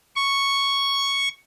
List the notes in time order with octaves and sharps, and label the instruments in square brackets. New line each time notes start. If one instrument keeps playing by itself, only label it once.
[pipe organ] C#6